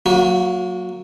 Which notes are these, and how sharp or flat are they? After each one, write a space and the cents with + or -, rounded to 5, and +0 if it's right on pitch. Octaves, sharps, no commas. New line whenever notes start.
F#3 +0 A#3 -10 F#4 -35